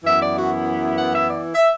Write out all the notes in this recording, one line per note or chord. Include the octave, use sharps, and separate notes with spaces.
F#2 E3 B3 E4 E5
D5
F#4
F#5
E5
D5
E5